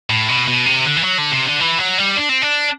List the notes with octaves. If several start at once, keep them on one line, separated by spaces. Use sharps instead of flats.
A2
B2
B2
C3
D3
E3
F#3
D3
C3
D3
E3
F#3
G3
D4
C4
D4